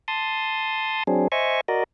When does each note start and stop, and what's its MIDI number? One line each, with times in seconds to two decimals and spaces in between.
0.08 1.03 81
0.08 1.03 84
0.08 1.03 87
1.07 1.28 54
1.07 1.28 60
1.07 1.28 62
1.07 1.28 68
1.32 1.61 72
1.32 1.61 75
1.32 1.61 76
1.32 1.61 80
1.32 1.61 85
1.68 1.84 66
1.68 1.84 70
1.68 1.84 74
1.68 1.84 75